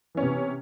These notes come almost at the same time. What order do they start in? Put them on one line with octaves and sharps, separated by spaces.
E3 C#4 B3 C3